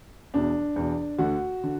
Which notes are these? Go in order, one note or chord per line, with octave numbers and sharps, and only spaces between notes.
E2 B2 D4
E2 B2
D2 D3 F#4
D3